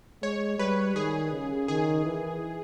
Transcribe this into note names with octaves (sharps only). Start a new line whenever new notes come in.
G#3 C#5
G3 B4
D#3 G#4
C#3
D#3 G#4
E3